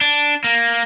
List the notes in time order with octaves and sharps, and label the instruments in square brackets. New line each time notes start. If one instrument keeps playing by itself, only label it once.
[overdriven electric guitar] D4
A#3